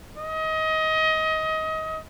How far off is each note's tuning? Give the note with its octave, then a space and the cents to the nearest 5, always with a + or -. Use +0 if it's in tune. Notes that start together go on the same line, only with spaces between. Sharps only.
D#5 +25